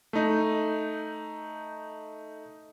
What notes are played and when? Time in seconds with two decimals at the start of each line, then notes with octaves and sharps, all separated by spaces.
0.13 A3 D#4